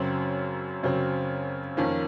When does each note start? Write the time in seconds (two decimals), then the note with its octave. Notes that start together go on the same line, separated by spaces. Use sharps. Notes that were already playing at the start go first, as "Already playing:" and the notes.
Already playing: F#2 C#3 F#3 C4
0.83 F#2 C#3 F#3 C4
1.77 F2 D#3 A#3 C#4